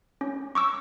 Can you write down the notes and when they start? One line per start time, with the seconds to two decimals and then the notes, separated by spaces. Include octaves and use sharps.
0.21 C#4
0.55 C#6 D6 E6